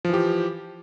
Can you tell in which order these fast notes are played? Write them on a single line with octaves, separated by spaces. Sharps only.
F3 E3 G4